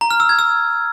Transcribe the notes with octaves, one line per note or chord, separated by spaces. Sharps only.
A#5
F6
E6
G#6
E6